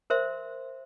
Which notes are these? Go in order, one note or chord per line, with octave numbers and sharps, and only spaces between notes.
A#4 C5 E5 C6